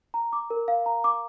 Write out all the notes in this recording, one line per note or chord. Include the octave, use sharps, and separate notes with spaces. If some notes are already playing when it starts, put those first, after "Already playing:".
A#5
D6
A#4
F5
A#5
D6